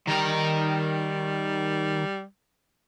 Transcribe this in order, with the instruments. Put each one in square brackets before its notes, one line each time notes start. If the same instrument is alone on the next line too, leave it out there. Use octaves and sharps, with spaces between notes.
[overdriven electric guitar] D#3 A#4 [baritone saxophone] G3